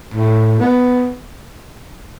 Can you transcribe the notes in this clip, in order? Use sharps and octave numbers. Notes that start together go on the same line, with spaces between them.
A2
B3